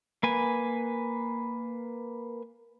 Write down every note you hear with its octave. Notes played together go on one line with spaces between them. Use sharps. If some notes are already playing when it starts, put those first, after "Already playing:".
A#3 B4 G#5